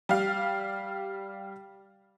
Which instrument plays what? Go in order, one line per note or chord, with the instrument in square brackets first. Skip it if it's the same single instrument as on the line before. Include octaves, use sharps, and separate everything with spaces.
[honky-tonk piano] G3 F5